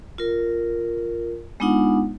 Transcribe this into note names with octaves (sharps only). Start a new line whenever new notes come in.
F4 A#4
G#3 B3 D4 D#4 F4 F#5